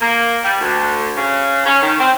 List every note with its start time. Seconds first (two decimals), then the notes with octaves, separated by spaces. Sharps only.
0.01 A#3
0.44 G3
0.61 D2
1.17 C#3
1.66 C#4
1.82 D#3
2.00 C4